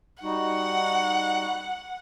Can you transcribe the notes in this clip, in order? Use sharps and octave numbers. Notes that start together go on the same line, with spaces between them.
G3 D#4 F#4 F#5